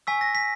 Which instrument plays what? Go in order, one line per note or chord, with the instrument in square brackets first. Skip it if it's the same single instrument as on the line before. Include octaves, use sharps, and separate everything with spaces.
[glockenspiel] G#5 C#6 E6 B6
A#6
B6